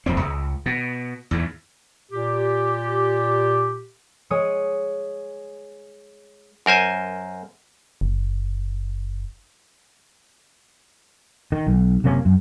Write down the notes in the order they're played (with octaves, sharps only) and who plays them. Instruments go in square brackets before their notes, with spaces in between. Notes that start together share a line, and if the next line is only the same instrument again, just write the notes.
[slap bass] D#1 F2 C4
C#2
B2
E2 G#2
[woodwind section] A#2 G4
[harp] G#3 C#5 D#6
[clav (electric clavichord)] F#2 A#4 C5 G#5
[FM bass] F#1
[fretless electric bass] D#3
B1
F#1 C3 A#3 C#4
F#2